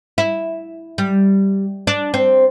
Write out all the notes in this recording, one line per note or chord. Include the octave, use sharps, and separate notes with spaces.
E4
G3
D4
C4